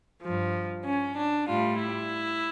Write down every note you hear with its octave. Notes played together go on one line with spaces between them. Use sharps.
G2 F3
C#4
D4
A2 G3 F4
E4